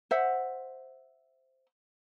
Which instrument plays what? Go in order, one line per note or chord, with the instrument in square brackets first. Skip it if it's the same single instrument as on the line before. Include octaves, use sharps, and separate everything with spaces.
[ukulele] C5 E5 F#5